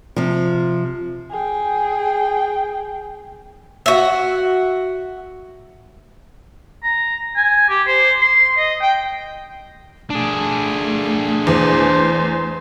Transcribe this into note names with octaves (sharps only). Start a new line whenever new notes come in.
C3 F3
G#4 G5
F#4 E5
A#5
G#5
G4
C5
C6
D#5
G5
A3 D4 G#4
E2 C5